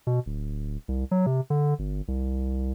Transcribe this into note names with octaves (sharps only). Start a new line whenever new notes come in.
B2
D1
C2
F#3
C3
D3
G1
C2